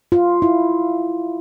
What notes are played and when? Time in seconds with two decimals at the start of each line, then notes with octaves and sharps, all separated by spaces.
0.12 F4
0.42 E4